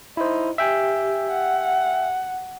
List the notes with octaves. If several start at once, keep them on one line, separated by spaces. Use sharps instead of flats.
D#4 E4 C5
G4 E5 G5 G#5
F#5